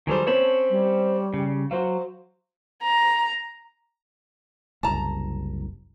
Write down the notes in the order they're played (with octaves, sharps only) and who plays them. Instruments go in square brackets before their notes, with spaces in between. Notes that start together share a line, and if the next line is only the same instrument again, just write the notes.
[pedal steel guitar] D#3 F#3 G3 [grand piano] G#4 A4 C5
[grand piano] C4 C#4 [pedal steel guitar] C#5 A5 B5
[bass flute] G3
[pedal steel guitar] C#3
[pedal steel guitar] F#3 [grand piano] F#4 C5 F5
[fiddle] A#5
[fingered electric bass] F#1 C2 [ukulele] A5 A#5